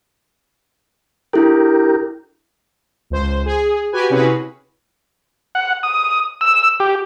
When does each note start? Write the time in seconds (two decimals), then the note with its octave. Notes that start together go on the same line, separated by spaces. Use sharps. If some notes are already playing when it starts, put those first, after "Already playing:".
1.33 D4 E4 G4 A4 A#4
3.10 C#2 C5
3.46 G#4
3.92 F#4 G4 B4 G#5
4.10 C3 C#4 E4 F#4 G#4 B4
5.55 F#5
5.83 D#6
6.41 E6
6.80 G4